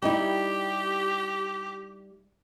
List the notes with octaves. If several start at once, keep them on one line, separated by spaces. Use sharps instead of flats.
G3 D#4 E4 G4